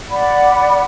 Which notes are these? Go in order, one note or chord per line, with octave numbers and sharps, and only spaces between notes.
D5 F#5 B5